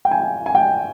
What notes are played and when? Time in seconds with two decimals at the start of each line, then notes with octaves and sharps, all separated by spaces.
0.05 G5
0.11 G#5
0.46 G#5
0.55 G5